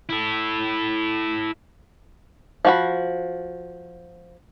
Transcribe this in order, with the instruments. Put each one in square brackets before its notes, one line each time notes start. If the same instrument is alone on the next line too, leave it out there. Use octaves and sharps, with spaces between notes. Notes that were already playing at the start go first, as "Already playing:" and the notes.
[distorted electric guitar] E4 A4
[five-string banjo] F3 F#4 B5